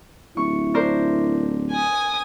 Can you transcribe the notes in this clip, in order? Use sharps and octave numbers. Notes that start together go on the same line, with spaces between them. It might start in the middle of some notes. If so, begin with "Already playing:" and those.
D1 E4 C#6
D4 A#4 C5
G#5 D#6